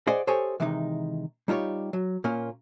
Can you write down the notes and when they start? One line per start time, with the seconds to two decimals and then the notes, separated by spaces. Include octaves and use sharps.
0.07 G#4 C5 D5 D#5 F#5 G#5
0.27 G4 A4 C5 C#5 D#5 G#5
0.60 C3 D#3 E3 G#3 D#4
1.48 G3 D#4 F4 G4 C#5
1.93 F#3
2.24 A#2 A#3 C#4 F4